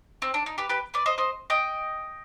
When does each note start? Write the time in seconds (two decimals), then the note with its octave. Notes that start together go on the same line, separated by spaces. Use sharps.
0.22 C4
0.34 D4
0.46 D#4
0.58 G4 B4
0.69 G4 B4
0.94 B4 D5
1.06 C5 D#5
1.18 C5 D#5
1.50 D#5 G5